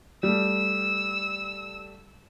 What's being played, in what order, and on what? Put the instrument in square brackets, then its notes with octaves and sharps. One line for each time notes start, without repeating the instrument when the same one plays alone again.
[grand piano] G3 A3 [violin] E6